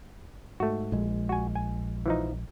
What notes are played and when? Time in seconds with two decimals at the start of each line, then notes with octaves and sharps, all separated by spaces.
0.60 G#2 A3 F#4
0.92 A#1 G#3
1.29 F#4 G#5
1.55 G#5
2.06 E3 F3 D#4